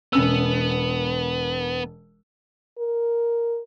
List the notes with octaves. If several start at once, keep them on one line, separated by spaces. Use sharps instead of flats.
E1 B3 C#4 E6
A#4